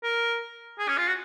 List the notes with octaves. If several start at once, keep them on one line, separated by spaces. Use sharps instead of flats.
A#4
G#4
C#4
F4
F#4